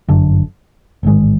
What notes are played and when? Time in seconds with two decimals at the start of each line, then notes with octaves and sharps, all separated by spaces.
0.09 G1 F#2 D3
1.03 A1 G#2 D#3 G#3